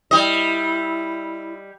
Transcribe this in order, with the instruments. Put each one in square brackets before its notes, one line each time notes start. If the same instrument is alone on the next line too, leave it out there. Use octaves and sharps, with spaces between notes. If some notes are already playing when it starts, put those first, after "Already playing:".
[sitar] G3 D#5 [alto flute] E4